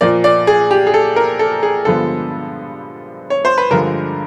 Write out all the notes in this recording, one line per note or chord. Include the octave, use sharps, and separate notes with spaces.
A#2 F3 A#3 D5
D5
G#4
G4
G#4
A4
A#4
A4
G#4
G2 D3 F3 G#3 B3 A4
C#5
C5
B4
G2 D3 F3 G#3 A#4